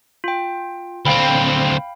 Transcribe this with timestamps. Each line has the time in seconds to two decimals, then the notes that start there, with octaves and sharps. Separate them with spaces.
0.24 F4 G5
1.06 D2 C4 F5 G5 B5